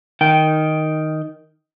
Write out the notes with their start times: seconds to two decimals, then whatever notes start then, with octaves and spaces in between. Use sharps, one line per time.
0.21 D#3 G5